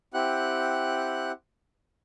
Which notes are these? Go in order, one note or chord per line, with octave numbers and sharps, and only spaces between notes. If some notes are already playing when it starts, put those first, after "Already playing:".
C4 E4 G4 F#5 F#6